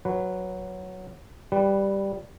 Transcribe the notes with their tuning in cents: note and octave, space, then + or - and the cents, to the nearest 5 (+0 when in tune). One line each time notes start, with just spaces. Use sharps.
F#3 +0 B4 +0
G3 +0 B4 +10